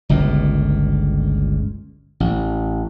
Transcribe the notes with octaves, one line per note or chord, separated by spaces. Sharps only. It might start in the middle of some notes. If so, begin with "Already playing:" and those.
G1 C#2 A#2
A1